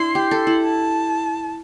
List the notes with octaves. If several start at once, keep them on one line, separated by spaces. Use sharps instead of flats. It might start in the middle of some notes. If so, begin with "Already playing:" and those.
Already playing: D4 E4 C6
G4
A4
E4
A5